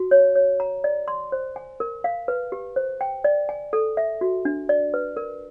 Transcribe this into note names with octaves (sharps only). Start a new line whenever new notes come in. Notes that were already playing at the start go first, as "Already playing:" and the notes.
Already playing: F#4
C#5
C#5
A#5
D5
C6
C5
G#5
A#4
F5
B4
G4
C5
G5
D5
G#5
A4
E5
F#4
D4
D5
B4
A#4